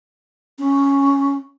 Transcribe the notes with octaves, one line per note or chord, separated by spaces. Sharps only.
C#4